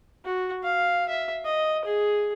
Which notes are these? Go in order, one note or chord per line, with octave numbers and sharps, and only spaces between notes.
F#4
F5
E5
D#5
G#4